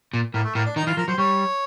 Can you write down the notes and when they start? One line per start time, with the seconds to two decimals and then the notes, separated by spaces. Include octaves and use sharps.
0.13 A#2
0.34 A2 A#3
0.44 A3
0.55 A2 A#3
0.66 D4
0.76 D#3 D#4
0.87 E3 F4
0.97 F3 A#4
1.08 F#3 C5
1.18 G3 C#5